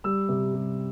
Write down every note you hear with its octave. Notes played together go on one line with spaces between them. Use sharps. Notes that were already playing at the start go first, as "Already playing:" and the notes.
G3 E6
C3
G3